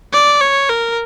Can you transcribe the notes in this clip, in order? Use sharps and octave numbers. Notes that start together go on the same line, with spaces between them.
D5
C#5
A#4